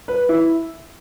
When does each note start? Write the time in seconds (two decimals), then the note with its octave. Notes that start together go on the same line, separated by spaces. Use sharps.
0.08 B4
0.29 E4